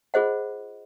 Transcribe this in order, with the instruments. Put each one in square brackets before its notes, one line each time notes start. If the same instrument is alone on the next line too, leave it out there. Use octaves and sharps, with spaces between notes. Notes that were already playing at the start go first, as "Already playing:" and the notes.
[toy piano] F4 G#4 C5 D#5 F#5